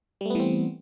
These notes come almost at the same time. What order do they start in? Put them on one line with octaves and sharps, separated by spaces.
G3 A3 B3 E3 C4